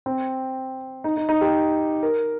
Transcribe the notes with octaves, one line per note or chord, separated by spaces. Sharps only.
C4
D#4
D#4
D#4
G4
A#4